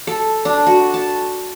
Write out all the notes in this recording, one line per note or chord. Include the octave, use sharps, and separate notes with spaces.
A4
D4
F#4
A5